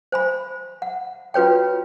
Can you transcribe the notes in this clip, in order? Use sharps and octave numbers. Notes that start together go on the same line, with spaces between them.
C5 G#5 B5
F#5
F4 F#4 B4 C#5 G5